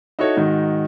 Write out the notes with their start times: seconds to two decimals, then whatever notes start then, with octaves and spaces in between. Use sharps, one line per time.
0.19 D#4 E4 F#4 A4 C#5
0.37 G#2 D#3 D#4 F#4